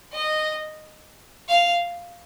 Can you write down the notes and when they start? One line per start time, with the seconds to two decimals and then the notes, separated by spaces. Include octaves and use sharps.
0.13 D#5
1.49 F5